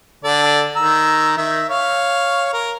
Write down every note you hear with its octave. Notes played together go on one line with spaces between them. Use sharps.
D3 A4 D5
D#3 A#5 E6
D#3 E5
C#5 F5
A#4